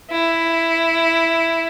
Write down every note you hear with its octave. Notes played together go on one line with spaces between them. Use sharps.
E4